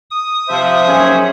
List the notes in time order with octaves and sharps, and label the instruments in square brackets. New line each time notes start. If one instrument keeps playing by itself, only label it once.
[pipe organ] D#6
[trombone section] C3 F3 [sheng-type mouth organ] C5 E5
[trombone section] D#2 G#4 [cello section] F#3 C#4